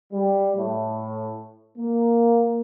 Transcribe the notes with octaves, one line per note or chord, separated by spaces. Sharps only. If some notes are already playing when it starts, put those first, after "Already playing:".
G3
A2
A#3